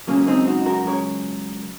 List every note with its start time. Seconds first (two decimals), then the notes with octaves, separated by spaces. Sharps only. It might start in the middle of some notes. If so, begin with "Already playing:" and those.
0.07 C#2 C#3 F#3 A#3 C#4
0.27 C4 D#4
0.47 D#4 F#4
0.66 F#4 A#4
0.85 C#2 C#3 F#3 A#4 C#5